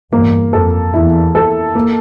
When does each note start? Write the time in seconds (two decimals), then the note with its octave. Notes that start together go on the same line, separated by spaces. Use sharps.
0.12 E2 G2 A#3
0.53 F2 A4
0.94 E2 E4
1.35 A4
1.75 A#3